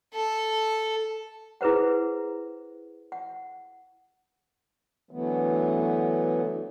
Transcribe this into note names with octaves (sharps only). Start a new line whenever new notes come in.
A4
E4 G#4 B4 C5 F#5
F#5
D3 E3 F#3 A3 B3